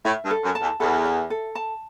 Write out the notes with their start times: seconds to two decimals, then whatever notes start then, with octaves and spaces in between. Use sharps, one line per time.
0.05 A2 E5
0.24 G2
0.31 A4
0.43 F#2
0.55 A5
0.61 E2
0.80 E2 A4
1.05 E5
1.30 A4
1.55 A5